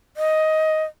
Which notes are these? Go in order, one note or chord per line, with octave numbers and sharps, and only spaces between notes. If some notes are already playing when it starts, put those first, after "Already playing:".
D#5